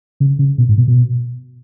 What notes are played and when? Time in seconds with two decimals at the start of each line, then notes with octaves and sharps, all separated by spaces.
0.20 C#3
0.39 C#3
0.58 B2
0.69 G#2
0.78 B2
0.88 B2